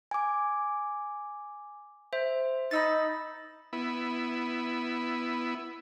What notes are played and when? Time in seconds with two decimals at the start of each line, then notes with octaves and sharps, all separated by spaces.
0.11 G#5 D6
2.13 C5 E5
2.71 D#4 B5 E6 A6
3.73 B3 E4